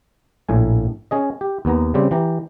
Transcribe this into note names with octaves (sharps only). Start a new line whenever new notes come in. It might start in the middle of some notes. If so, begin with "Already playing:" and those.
A#1 A2 G#5
C#4 G#4 D#5
G4
D#2 B3 A#5
C#3 G3 C4 G4
E3 G4 A#5